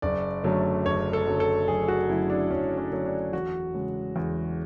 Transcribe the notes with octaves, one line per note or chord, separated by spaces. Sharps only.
F#1 D5
F#2 D3 F#3 A3
F#1 C#5
A4
F#2 D3 F#3 A3
A4
F#1 G#4
F#4
F#2 D3 F#3 A3 E4
D4
F#1 C#4
C#4
F#2 D3 F#3 A3
D4
E2 F#4
C#3 G#3
E2